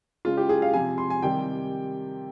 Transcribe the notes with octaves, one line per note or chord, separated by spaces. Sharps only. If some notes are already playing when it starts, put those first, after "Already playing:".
C#3 G#3 F4
G4
G#4
F5
C3 F3 G#3 G#5
C6
G#5
C3 D#3 G3 G5